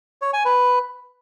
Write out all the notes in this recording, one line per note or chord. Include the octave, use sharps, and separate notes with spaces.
C#5
G#5
B4